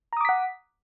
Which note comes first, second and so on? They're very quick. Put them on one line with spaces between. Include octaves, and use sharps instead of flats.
A#5 D#6 D6 B6 F#5